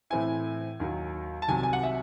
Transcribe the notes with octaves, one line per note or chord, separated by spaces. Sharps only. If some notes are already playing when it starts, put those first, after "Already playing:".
A2 E3 C4 E4 G#5
D#2 D#3 F#3
A5
C2 C3 D#3 F#3 G#5
G#5
F#5
E5